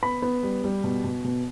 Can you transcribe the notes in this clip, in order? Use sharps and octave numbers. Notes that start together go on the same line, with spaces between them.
B3 B5
B3
G3
G3
B2
B2
B2